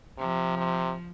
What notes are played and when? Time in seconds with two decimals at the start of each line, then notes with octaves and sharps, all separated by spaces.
0.18 C3 F3
0.57 C3